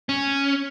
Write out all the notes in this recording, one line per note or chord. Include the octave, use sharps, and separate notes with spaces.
C#4